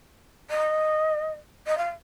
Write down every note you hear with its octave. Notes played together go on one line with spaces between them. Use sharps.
D#5
D#5
F5